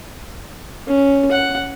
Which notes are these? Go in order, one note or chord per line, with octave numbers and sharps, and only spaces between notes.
C#4
F#5